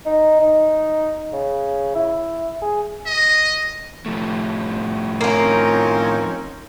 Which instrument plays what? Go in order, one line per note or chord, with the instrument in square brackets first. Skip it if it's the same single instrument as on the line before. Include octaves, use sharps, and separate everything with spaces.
[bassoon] D#4
D#4
C#3
E4
G#4
[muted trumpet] D#5
[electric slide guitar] A2 F3 A3
[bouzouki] A#3 F4 [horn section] C4 C#4 D#4